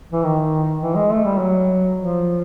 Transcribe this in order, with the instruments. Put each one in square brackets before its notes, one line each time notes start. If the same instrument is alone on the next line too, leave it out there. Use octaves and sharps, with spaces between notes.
[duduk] E3
D#3
E3
G#3
A3
G3
F#3
F3